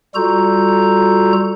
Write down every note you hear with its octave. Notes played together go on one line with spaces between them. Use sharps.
G3 F4 F#4 A4 A#5 G6